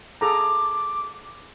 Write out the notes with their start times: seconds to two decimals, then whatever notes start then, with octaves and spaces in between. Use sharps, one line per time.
0.21 G#4 A4 A#5 D6